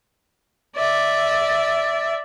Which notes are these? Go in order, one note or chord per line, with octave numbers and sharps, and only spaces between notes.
D5 E5